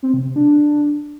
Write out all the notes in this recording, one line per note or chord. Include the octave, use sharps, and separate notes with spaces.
C4
C3
C3
D4